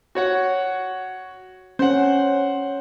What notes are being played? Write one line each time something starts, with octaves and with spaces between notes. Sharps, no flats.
F#4 C#5 F#5
C#4 C5 F#5